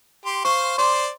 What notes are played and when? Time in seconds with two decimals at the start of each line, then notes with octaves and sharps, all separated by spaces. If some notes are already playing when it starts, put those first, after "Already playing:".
0.26 G4 C6
0.45 C5 F5 C6 C#6
0.78 C5 D5 C6